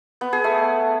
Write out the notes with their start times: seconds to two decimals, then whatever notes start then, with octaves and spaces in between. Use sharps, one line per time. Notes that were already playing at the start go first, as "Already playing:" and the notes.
0.21 B3
0.33 G#4
0.44 A3